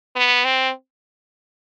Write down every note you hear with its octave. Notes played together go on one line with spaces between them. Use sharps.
B3
C4